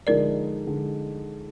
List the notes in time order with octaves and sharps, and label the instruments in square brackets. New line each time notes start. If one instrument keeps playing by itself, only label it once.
[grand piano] D3 F3 G#3 D#4 [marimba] A#4 D5
[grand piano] D3 G#3